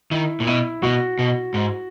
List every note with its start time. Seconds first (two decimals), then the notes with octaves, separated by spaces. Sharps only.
0.11 D#3 E4
0.40 A#2
0.47 B2 E4
0.83 B2 F#4
1.19 B2
1.54 G#2